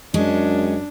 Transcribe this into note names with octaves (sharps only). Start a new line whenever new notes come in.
F#2 G#3 C#4 D4